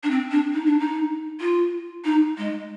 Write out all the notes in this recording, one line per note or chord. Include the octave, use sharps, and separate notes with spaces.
D4
C4
D4
D#4
D4
D#4
F4
D#4
G#3